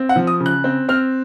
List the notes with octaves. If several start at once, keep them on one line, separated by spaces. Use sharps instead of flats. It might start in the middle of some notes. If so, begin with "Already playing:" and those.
Already playing: C4
F#5
F3
D#6
C#3
F#6
C4
C4 F6